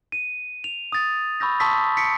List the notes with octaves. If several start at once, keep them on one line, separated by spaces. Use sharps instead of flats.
D#7
F7
D#6 A6
B5 C#6 E6 G6 A#6
A5 C6 C#6 D#6 E6 B6
B6 C#7 D7